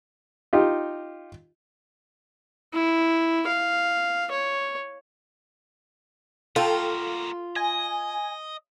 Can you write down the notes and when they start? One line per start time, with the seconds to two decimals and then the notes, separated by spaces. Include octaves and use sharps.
0.53 D#4 F4 G4
2.73 E4
3.47 F5
4.31 C#5
6.56 A#3 F4 F#4 A4 G5
7.56 D#5 G#5